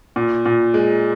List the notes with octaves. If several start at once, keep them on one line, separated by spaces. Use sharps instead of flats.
A#2
A#2
G#3